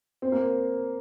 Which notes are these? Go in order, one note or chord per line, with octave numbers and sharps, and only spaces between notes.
C4
A#3